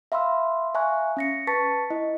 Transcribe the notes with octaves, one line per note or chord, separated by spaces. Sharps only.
E5 F5 B5 C6 E6
E5 F5 G#5 A#5 C#6 F#6
C#4 A#6 C#7
B4 A5 C#6 A6 B6 C#7
E4 D#5